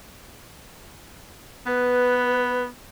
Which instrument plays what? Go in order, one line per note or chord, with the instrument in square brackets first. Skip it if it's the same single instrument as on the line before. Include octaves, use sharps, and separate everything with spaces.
[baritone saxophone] B3 [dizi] B4